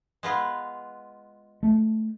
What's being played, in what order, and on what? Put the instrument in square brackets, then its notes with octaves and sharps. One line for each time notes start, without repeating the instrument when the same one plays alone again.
[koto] G#3 B3 F4
[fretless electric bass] A3